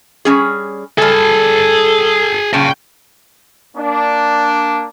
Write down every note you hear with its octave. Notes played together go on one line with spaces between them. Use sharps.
G3 C#4 G#4
G3 G#4 A4 G#5 A5
A#2 C#3 G5 A5
A#3 D4